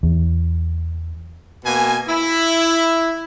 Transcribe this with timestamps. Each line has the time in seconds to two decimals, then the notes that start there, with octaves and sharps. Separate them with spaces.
0.03 E2 E3
1.65 B2 A#3 G#5
2.08 E4